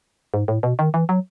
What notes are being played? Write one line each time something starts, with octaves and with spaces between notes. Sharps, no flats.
G#2
A2
B2
D#3
E3
F#3